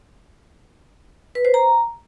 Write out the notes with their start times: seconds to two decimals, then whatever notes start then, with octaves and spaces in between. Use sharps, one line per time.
1.35 B4
1.45 C5
1.54 A#5